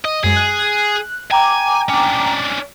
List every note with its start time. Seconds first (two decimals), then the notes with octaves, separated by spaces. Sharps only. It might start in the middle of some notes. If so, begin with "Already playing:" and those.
0.05 D#5
0.24 F#2 G#3 G#4
0.36 F#6
1.31 G5 G#5 A#5 D6
1.89 C#4 D4